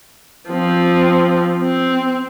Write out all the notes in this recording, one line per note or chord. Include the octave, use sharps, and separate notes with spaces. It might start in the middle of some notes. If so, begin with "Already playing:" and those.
F3 C4
C4